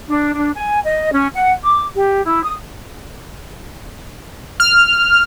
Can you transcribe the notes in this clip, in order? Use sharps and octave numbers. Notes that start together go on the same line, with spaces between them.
D4
D4
G#5
D#5
C#4
F#5
D6
G4
E4
D#6
F6